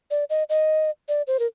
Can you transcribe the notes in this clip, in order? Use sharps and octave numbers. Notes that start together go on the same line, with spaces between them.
D5
D#5
D#5
D5
C5
A#4